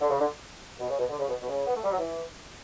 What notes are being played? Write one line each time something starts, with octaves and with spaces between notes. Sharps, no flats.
D3
C#3
D3
B2
C#3
B2
D3
C#3
B2
B2
C#3
B3
A3
G3
F#3
E3